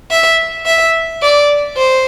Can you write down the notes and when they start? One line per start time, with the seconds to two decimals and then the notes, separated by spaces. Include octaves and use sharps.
0.11 E5
0.66 E5
1.22 D5
1.77 C5